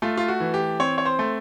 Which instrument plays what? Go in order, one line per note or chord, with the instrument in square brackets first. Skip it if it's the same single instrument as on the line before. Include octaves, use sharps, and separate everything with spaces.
[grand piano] A3 F4
F4
F#4
E3
G4
C4 C#5
C#5
C5
A3